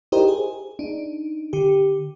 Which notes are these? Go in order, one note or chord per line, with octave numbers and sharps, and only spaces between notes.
D#4 E4 G4 A#4 C5 D#5
G#4
D4 D#4
D3 G4